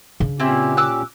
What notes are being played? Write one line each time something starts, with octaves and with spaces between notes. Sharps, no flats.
C#3 D4
A#2 C4 C#4 E4 G4
D6 E6 F#6